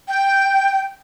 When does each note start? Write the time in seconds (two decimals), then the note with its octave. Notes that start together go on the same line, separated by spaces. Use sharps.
0.08 G5